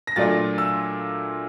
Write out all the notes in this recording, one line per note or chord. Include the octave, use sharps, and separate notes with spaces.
A#6
A#2 F#3 A3 D4 F4 A6
E6